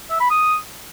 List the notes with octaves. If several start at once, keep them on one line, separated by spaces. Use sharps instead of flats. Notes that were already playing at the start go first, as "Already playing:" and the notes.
E5
B5
D#6